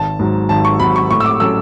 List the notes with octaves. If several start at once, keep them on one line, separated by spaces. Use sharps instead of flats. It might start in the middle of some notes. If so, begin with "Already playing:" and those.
Already playing: G#1 A5
G#2 F#3
G#1 A5
C#6
G#2 F#3 B5
C#6
A2 C#6
E6
D6
F#3 C#4 F#4 A4 E6